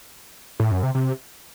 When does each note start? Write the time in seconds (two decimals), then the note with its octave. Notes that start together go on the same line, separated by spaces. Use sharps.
0.60 A2
0.71 F#2
0.83 C3
0.95 C3